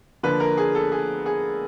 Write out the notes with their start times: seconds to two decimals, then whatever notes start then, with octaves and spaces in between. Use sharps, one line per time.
0.23 D3 F3 A#3 B4
0.40 A#4
0.57 G#4
0.75 A4
0.92 G#4
1.26 G#4